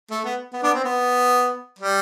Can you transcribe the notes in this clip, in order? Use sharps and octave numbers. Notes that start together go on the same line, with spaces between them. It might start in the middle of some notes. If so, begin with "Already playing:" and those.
A3
B3
B3
B3 D4
C4
B3
G3